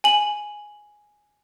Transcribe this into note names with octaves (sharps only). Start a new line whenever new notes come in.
G#5 F#7